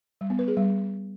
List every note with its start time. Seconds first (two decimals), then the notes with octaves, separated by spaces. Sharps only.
0.21 G3
0.30 B3
0.39 B4
0.48 G#4
0.57 G3